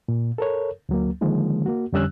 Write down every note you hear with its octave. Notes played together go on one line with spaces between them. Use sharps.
A#2
A4 A#4 C#5
D2 F#3 A#3
D3 D#3 F3 G#3 A#3
A#3 F#4
F2 D3 G3 C#4 E6 F#6